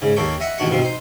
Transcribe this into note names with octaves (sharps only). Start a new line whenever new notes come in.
G#2 C#3
D#2 A#3 G4 A4 C#5 G5
D#5 E5 F#5
A1 A#2 D#3 D4 F#4 F#5
G2 B2 D#3 F3 A#3 C4
D#4 C5